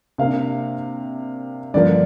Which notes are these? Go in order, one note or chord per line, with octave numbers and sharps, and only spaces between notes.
C3 A#3 D4 F5
G2 D3 F3 A#3 D4 D5